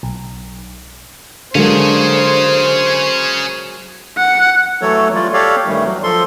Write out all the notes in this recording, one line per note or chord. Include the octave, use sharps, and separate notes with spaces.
B1
D3 F#3 G#3 A#3 C#4 G#4 C5
F#5
E3 F#3 A3 A4 C#5
G3 A3 F4 D5
G4 A4 C#5 D5 F5
G2 D#3 E3 G3 A3
F#3
F3 A4 C6